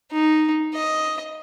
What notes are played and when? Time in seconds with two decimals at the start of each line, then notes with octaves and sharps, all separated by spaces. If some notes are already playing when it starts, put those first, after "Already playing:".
0.11 D#4
0.74 D#5